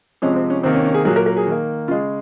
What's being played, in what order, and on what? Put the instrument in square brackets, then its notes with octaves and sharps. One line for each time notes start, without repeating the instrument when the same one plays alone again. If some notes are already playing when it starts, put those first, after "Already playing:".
[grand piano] C3 F3 G#3 C#4
C4
C#4
C3 D#3 A#3 C4
C#4
C#4
G#4
A#2 F#3 A#3 G#4
A#4
A#4
G#4
D#3 A#3
C#3 F4
G#3